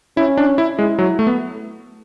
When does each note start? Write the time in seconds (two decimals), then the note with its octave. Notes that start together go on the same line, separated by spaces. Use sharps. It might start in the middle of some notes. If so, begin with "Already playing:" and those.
0.17 C#4 E4
0.37 D4
0.58 E4
0.78 G#3 E4
0.99 F#3
1.19 A3
1.27 B3